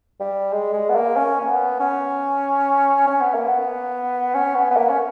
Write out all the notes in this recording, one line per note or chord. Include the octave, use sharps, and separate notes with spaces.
G3
G#3
G#3
B3
A#3
C#4
A#3
B3
C#4
C#4
B3
A#3
B3
C#4
B3
B3
A#3
C#4